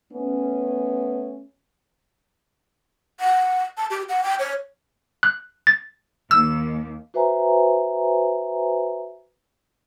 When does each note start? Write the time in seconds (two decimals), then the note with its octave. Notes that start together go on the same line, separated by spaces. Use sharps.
0.12 A3 B3 C#4
3.20 F#5
3.77 A5
3.90 G4
4.09 F#5
4.23 G5
4.39 C#5
5.23 F#6
5.67 A6
6.31 D#2 E6
7.14 F#4 B4 C5 E5 G#5 A#5